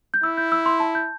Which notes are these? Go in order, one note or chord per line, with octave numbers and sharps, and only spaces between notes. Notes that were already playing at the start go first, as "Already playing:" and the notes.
G6
E4 E6
G6
E6
C6
A5
G6